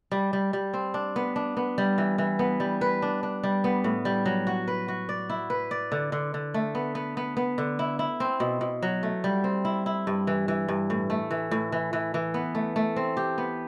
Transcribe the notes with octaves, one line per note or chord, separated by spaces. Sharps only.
G3
G3
G3
C4
D4
B3
D4
B3
G3
E3
E3
B3
G3
B4
D4
D4
G3
B3
A2
G3
F#3
F#4
B4
F#4
D5
E4
B4
D5
D3
D3
D3
A3
B3
B3
B3
B3
D3
E4
E4
C4
B2
B2
F#3
A3
G3
C4
E4
E4
G2
E3
E3
G2
A2
A3
E3
A2
E3
E3
E3
B3
A3
A3
C4
G4
B3